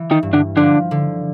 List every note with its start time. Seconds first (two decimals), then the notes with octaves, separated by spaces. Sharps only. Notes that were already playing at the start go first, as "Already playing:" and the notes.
Already playing: E3
0.11 D#3 D#4
0.23 G2
0.33 D3 D4
0.57 D3 F3 D4
0.91 D3